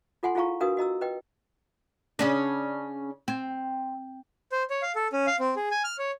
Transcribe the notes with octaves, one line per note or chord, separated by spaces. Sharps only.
F4 A4 F#5 G#5 C6
E4 F4 G#4 F5 A#5 C#6
D4 F#4 A#4 B4 F5 D#6
F#4 D#5 A#5 E6
B4 D#5 G5
C#3 C#4 D4
C4
C5
C#5
F5
A4
C#4
F5
C4
G#4
G#5
F6
C#5